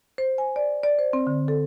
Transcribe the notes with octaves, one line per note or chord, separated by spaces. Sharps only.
C5
G#5
D5
D5
C5
C4
D3
A4